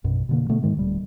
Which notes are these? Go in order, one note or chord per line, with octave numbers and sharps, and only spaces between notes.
A#1 F#2 B2
B2 D3 A#3
B2 D3 A3 B3
G#2 D#3 G#3
D#1 G3